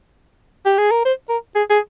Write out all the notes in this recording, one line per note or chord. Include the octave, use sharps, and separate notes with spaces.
G4
G#4
A#4
C5
A#4
G#4
G#4